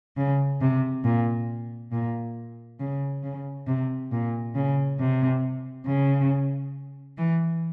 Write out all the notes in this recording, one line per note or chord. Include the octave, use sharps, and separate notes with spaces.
C#3
C3
A#2
A#2
C#3
C#3
C3
A#2
C#3
C3
C#3
E3